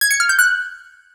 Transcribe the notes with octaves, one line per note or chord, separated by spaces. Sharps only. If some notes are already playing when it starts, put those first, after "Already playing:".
G#6
C#7
F6
G6
F#6